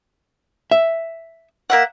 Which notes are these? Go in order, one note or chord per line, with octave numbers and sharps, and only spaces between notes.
E5
A#3 E5 F#5